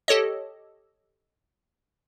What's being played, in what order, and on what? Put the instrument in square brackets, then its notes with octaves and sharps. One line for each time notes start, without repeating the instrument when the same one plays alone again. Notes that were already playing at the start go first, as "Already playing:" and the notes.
[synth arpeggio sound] G4 A4 C#5 D#5